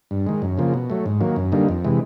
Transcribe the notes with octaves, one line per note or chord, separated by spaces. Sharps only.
G2
D#3 G#3
F#2
C#3 F3 A#3
B2
F#3 A3
G#2
D#3 F#3 A#3
F#2
D3 G3 A#3 D#4
F2
C3 E3 G#3